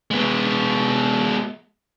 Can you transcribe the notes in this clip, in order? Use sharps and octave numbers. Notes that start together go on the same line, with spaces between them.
G#3 B3